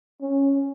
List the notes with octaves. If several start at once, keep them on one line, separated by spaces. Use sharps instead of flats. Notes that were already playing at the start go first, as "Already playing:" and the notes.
C#4